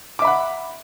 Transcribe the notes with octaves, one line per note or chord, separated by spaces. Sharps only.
E5 F#5 B5 D6